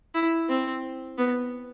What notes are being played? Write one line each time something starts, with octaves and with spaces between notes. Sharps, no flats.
E4
C4
B3